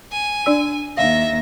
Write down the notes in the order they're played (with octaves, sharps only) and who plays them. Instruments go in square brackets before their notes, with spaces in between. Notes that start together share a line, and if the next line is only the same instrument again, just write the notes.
[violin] G#5
[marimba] D4 D5 E6
[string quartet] D#2 A#6 [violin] E5 [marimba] F5